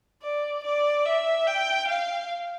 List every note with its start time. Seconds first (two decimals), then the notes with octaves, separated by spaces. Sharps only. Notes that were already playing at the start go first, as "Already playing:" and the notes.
0.22 D5
0.64 D5
1.06 E5
1.47 G5
1.88 F5